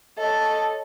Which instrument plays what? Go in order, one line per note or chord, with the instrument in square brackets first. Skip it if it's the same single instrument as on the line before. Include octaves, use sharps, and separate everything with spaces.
[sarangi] A4 [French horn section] C#5 D#5